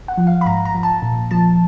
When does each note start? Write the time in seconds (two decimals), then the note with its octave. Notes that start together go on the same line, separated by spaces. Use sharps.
0.08 F#5
0.17 F3
0.27 F5
0.41 B5
0.46 G#2 A#5
0.65 A#5
0.75 F3
0.83 A5
1.02 A#2
1.31 F3 A5